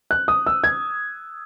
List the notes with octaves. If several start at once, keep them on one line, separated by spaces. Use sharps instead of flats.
F#6
D#6
E6
G#6